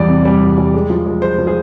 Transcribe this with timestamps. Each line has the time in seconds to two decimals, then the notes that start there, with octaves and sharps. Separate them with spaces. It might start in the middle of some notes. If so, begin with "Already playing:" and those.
Already playing: E2 G3 D5
0.09 C3
0.25 G3
0.41 E2
0.58 G3
0.74 G#3
0.90 F3
1.06 G#3
1.22 G#3 C5
1.39 F3
1.47 G#4